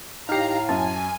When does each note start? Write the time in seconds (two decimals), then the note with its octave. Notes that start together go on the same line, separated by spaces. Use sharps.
0.29 A2 D#4 G4 F5 A#5 F6 C7
0.69 F#2 G#5 A5